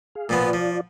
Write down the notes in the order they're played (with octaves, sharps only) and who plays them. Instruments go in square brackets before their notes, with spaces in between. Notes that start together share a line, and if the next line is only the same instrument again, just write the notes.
[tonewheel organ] G#4 F5
[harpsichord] A#2 F3 B3 [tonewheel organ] F4 D5
[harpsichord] F3